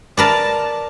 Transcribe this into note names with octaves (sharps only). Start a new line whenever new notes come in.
A#4 B4 D5 A5